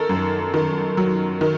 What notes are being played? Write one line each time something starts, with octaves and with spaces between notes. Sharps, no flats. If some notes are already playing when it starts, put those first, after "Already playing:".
Already playing: D#3 A4 A#4
F#2
D#3
F#3
D#3